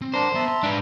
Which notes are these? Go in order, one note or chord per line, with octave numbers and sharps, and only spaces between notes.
C4
D4 A#4 C5 F#5 A#5
B3 E5 A5 A#5
C6
G#2 D4 B4